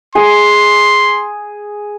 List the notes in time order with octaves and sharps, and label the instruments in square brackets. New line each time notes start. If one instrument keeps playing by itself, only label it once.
[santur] G#4 [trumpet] C6